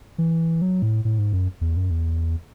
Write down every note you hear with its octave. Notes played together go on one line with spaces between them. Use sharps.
E3
F#3
A2
A2
G#2
F#2
E2
F#2
E2